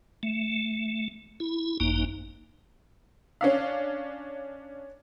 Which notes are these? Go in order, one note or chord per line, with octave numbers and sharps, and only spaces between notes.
A3
E4
G#1 F#2 A#3 D#4
C#4 D4 F5